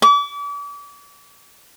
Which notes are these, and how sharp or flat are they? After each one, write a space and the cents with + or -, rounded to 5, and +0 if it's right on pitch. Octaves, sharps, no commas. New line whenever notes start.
D6 -40